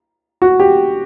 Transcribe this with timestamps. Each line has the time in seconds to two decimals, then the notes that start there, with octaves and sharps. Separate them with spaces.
0.42 F#4
0.60 G4